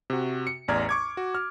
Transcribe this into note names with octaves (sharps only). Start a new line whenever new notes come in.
C3 F#4
C#7
A1 E2 D5 A#5 F6 G#6
C#6 D6 G#6
F#4
F6